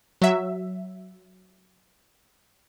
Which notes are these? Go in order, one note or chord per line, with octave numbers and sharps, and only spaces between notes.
F#3 E5